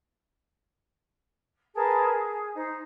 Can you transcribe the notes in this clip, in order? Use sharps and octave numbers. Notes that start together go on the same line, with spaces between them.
G#4 A#4 B4 A5
G#4
D#4 C5